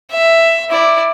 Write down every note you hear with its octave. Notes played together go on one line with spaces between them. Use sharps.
E5
E4 D5